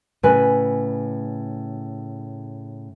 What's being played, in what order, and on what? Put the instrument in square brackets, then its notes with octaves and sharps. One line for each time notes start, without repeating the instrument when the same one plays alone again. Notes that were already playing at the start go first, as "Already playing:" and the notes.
[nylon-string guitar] A2 C#3 B4 G#5